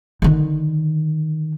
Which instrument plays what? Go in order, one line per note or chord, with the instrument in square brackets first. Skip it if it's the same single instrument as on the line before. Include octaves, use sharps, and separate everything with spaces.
[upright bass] D3 D#3